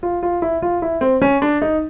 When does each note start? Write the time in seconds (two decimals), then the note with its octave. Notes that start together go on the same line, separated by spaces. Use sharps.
0.03 F4
0.23 F4
0.42 E4
0.62 F4
0.82 E4
1.01 C4
1.22 C#4
1.42 D4
1.62 D#4